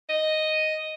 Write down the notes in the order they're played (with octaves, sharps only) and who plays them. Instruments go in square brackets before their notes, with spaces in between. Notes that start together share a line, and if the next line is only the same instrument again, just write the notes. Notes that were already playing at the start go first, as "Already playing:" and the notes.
[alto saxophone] D#5